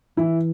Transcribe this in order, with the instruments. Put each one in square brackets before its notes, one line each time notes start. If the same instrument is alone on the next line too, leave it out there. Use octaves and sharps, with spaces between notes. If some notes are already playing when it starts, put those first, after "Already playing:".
[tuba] E3 [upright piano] E4